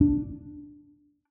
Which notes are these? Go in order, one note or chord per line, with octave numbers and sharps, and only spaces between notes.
D4